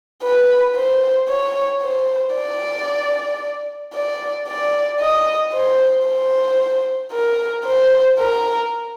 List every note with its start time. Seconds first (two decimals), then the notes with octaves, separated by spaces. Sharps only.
0.23 B4
0.75 C5
1.29 C#5
1.82 C5
2.35 D5
3.94 D5
4.47 D5
5.00 D#5
5.53 C5
6.06 C5
7.12 A#4
7.65 C5
8.18 A#4